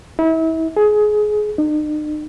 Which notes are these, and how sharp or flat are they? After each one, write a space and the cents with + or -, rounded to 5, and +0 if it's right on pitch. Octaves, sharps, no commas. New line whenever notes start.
E4 -35
G#4 +20
D#4 -45